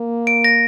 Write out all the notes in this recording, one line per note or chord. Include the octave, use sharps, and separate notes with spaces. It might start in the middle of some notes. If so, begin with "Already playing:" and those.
Already playing: A#3
D7
A#6